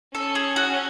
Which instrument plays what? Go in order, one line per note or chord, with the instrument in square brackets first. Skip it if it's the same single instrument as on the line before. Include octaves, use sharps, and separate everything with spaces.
[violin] C#4 [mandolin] A4
[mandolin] G#4
F#4